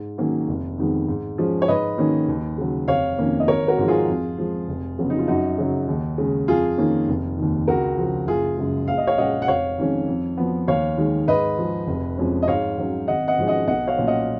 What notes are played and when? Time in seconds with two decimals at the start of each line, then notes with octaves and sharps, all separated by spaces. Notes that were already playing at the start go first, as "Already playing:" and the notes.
Already playing: G#2
0.18 D#3 F#3 A#3 C#4
0.48 F1
0.78 F2 D#3 G#3 B3
1.08 G#2
1.38 F3 G#3 C#4
1.62 C#5
1.68 G#2 B4 D#5
1.98 D#3 A#3 C#4
2.28 D#2
2.58 C#3 F#3
2.88 F1 C#5 F5
3.18 F2 D#3 A#3 C#4
3.40 D#5
3.48 G#1 A#4 C#5
3.68 F#4 A#4
3.78 G#2 F3
3.88 F4 G#4
4.08 F2
4.38 F3 G#3
4.68 F1
4.98 F2 C#3 F#3 B3
5.10 D#4
5.19 F4
5.27 F#2 D#4 F#4
5.58 C#3 F#3
5.88 D#2
6.18 C#3 G#3
6.48 F2 F4 G#4
6.78 D#3 A#3 C#4
7.08 F1
7.38 D#2 D#3
7.68 C#2 F#4 A#4
7.97 C#3 F3
8.28 F#1 F4 G#4
8.58 F#2 C#3 G#3
8.88 A#1 F5
8.98 D#5
9.07 C#5 F5
9.18 A#2 G#3 C#4 D#5 F#5
9.42 F#5
9.48 F1 C#5 F5
9.78 F2 D#3 G#3 C#4
10.08 F2
10.38 F3 B3
10.67 D#2 C#5 F5
10.98 D#3 G#3
11.27 G#2 B4 D#5
11.58 F3 G#3
11.87 F1
12.18 F2 F3 G#3 C#4
12.42 D#5
12.48 G#2 C#5 F5
12.78 F#3 C#4
13.08 G#1 D#5 F#5
13.28 D#5 F#5
13.38 G#2 F3 G#3 C#4
13.47 D#5 F#5
13.68 B1 D#5 F#5
13.87 C#5 F5
13.98 A#2 F#3 C#4
14.07 D#5 F#5